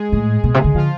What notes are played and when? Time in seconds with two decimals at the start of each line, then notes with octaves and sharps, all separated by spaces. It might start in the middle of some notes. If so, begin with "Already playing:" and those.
Already playing: G#3 G#4
0.12 A2
0.44 B2
0.54 C3
0.64 D3
0.74 D3 F3 F4